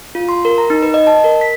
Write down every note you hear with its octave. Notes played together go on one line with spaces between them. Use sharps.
F4
C6
A#4
A#5
D#4
B4
D#5
A5
A#4
B6